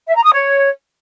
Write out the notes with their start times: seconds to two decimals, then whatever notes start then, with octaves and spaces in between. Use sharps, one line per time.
0.07 E5
0.16 A#5
0.24 D#6
0.33 C#5